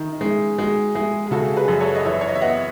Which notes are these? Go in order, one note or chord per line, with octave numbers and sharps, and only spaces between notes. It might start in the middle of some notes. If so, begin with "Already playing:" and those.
Already playing: D#3 D#4 E4
D#4
G#3 C#4 E4
G#3 D#4 F#4
G#3 E4 G#4
G#4
C#3 F#4 A4
G#4 B4
F#2
A4 C#5
D#5
E3 C#5 E5
C#5
D#5
E5
B3 D#5 F#5